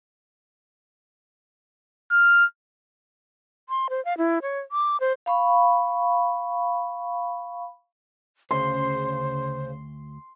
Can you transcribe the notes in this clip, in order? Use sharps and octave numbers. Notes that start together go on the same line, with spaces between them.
F6
C6
C5
F5
E4
C#5
D6
C5
F5 B5 C#6
D2 C#3 C5 C6